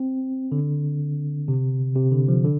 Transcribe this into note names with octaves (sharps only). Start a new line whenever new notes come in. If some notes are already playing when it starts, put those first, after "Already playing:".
Already playing: C4
D3
C3
C3
D3
F3
D3